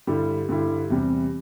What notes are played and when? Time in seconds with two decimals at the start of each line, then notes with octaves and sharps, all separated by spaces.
0.07 G2 D3 G3 E4
0.49 G2 D3 G3 E4
0.90 E2 C3 G3